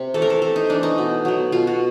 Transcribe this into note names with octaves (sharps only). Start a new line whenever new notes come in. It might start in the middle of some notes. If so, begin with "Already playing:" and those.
Already playing: C3
E3 A3 A4
A#4
A4
C3 A4
D#4
E3 A3 D4
D#4
B2
F#3 B3
B2 F4
F#4